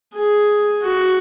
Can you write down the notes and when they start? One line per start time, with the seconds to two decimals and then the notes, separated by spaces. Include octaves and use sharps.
0.14 G#4
0.83 F#4